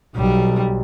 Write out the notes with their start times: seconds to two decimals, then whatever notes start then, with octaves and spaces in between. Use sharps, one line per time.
0.16 B1 G3